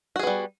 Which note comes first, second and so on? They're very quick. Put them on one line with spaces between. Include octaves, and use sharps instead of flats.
F#4 G#4 B3 G3